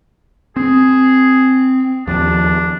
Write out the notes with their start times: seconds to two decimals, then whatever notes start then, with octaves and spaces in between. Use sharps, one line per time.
0.56 C4 G#4
2.07 D#2 F3 D4